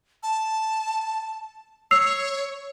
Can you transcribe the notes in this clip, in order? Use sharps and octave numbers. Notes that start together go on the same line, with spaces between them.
A5
C#5 E6 C7 F7